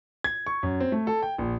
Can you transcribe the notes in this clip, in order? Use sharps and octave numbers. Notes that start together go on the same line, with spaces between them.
G#6
C#6
F#2
C4
A3
A4
G5
A#1